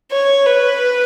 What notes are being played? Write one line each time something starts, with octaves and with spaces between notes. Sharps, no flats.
C#5
B4